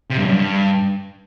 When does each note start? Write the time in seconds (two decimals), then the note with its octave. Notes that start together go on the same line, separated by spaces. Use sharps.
0.10 C3
0.18 G2
0.25 F#2
0.33 G2